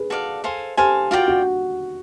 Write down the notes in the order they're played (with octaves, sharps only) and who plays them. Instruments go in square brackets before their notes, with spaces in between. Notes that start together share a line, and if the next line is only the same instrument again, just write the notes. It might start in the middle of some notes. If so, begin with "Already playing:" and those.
Already playing: [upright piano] G#4 B4
[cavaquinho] F#4 A4 D5 F5
A4 C5 F5 G#5
[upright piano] G4 [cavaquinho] A4 C5 F5 G#5
[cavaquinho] F4 A#4 D5 G5 [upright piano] F#4
[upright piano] F#4